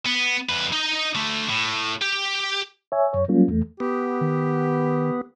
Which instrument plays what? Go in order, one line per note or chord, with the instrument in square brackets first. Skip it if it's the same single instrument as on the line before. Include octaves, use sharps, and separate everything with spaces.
[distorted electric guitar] B3
F2 B4
D#4 D#5
D3 A3
A2
G4
[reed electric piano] C#5 E5 G#5
F#2 C#5
F#3 G3 A#3 C#4 F4
E2 A3
[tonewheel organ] B3 [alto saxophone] G4
[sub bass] D#3